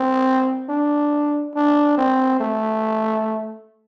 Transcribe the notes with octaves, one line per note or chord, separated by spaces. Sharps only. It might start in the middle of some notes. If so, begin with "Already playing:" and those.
Already playing: C4
D4
D4
C4
A3